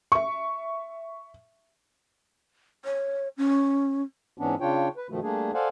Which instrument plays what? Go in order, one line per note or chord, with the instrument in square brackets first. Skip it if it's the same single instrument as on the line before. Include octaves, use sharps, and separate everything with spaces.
[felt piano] E5 C#6
[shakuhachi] C#5
C#4
[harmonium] G#2 E3 B3 C#4 D4
C#3 D4 F4 C#5 G5
B4
G2 B2 D#3 F3 A3
G3 A3 A#3 D4 G#4
A4 C5 D5 F5 F#5 G#5